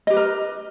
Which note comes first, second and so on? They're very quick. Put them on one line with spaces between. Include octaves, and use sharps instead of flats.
D#5 G4 B4 A#4